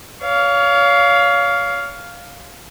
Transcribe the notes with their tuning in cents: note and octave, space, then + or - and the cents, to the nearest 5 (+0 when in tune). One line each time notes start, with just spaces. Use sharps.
C#5 +35 F5 +0